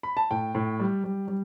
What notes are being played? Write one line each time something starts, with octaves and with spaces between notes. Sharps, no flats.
B5
A5
A2 G5
A2
G3
G3
G3